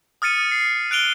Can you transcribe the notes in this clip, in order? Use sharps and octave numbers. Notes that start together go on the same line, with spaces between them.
D#6 F6 A6 C#7 D#7
C7
F#6 D7 F7 G7